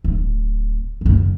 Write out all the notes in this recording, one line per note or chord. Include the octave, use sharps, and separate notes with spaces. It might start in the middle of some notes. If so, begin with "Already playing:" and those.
D1
F#2 C#3